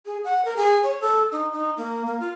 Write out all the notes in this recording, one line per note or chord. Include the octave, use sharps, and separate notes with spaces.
G#4
F#5
A#4
G#4
C#5
A4
D#4
D#4
A#3
A#3
F4